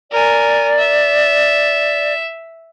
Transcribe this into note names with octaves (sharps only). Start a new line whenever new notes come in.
A#4 D5 G#5
E5